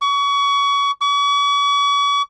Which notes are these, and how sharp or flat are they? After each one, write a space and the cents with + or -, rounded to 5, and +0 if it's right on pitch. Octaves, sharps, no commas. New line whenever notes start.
C#6 +30
C#6 +45